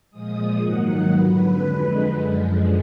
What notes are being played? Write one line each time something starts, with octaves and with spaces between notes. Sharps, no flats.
A#2 F3 G#3 D#6
G#2 D#3 F#3 A#3 F#5
F2 D3 F#3 B4
F2 D3 G#3
F#2 D3 F3 G#3